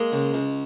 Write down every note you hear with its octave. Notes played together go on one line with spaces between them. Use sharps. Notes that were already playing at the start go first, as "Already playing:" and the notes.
Already playing: G#3 A#3
C#2
C#2